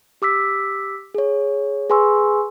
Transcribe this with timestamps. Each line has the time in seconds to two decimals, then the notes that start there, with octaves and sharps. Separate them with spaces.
0.22 G4 D6 E6 B6
1.14 G#4 C#5
1.90 G#4 B4 G#5 C6 C#6 E6